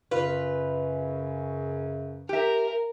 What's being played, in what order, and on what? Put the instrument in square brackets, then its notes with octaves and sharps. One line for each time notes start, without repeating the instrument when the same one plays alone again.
[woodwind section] F#2 C#3 [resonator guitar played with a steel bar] F4 [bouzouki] B4
[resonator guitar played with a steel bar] G4 E5 [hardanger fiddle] A#4